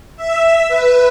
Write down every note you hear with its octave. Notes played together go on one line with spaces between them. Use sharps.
E5
B4